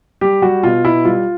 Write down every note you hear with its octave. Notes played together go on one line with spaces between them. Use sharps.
G3 G4
G3 F#4
B2 F4
B2 E4
G3 F4